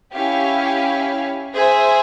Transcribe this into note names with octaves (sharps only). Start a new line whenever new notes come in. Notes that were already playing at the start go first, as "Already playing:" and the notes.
C#4 E4 G4 C#5 F5
G#4 C5 E5